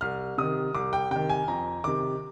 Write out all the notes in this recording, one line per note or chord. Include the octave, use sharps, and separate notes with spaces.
C2 F6
C3 D#3 D#6
C2 D6
G5
C3 D#3 G5
G#5
F2 A#5
C3 D#3 D6